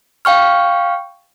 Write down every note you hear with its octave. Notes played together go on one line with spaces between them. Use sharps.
F5 G5 C#6 F6